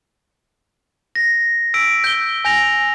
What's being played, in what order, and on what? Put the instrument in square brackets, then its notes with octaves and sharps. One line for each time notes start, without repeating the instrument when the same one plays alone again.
[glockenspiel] A#6
E6 B6 D7
G6 G7
G#5 G6 A#6 F7